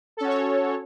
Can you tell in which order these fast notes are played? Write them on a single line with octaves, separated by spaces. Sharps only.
A4 C#4 F#4 C#5